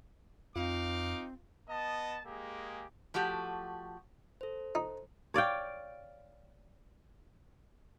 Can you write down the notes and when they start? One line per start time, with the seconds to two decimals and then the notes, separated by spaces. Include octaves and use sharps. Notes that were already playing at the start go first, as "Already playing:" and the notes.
0.56 F2 C4 D#4 F4 F5 D6
1.68 B3 D#5 A5
2.25 G#3 A#3 G4 G#4
3.14 F3 A3 F#4 G4
4.41 A4 C5
4.75 D#4
5.34 C#5 D5 F5 G5